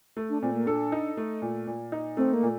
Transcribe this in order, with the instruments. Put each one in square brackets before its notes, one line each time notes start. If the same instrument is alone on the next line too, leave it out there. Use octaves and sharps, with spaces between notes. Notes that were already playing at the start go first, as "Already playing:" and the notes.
[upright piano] A3
[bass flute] D4
[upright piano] A#2 [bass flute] C4
[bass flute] A#3
[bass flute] D4 [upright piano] A4
[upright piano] D#4
A3
A#2
A#2
D#4
[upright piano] A3 [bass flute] C4
[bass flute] A#3
[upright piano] A#2